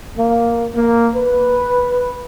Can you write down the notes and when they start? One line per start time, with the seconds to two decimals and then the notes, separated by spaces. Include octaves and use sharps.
0.17 A#3
0.74 A#3
1.15 B4